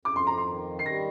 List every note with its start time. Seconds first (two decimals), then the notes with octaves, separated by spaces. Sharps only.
0.05 F2 D6
0.16 C6
0.27 A#5
0.38 C6
0.46 D#3
0.79 C7
0.86 G3 A#6